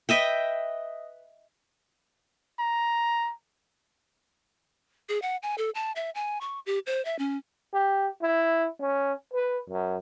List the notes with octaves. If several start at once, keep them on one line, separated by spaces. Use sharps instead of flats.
B4 D#5 E5 G5
A#5
G#4
F#5
G#5
A4
A5
E5
G#5
C#6
G4
C5
E5
C#4
G4
E4
C#4
B4
F#2